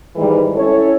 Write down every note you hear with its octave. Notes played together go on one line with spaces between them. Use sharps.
G#2 D#3 E3 G3 G#3
C#4 E4 A4 C#5